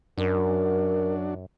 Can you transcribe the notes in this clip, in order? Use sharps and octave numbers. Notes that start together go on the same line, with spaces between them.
F#2 F#3 D4 A#4